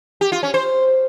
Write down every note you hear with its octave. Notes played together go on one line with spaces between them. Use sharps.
G4
F4
C#4
C5